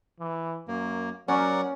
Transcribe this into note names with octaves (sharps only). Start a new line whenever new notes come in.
E3
F#2 A#3
F#3 C#4 A#4 D5 F#5